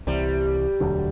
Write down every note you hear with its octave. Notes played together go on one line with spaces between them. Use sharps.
C2 C3 E3 G3
E1 D2 D3 F#3